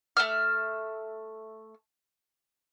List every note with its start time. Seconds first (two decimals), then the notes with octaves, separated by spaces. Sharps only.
0.17 A3 E5 F6